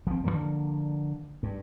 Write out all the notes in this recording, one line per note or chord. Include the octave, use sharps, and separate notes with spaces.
F3 C4
D3 D#3 F3 A#3
G2